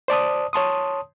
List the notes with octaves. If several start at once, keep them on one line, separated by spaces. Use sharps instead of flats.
C5 D5 A5 D#6
C#5 A5 C6 D#6